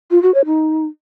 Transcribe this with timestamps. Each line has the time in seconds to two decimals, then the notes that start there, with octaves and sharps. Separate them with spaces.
0.11 F4
0.23 F#4
0.34 C#5
0.46 D#4